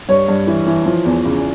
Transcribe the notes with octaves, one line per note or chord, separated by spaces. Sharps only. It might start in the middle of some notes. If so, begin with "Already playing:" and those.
G2 C#5
G2
E3
E3
F3
E2
C#3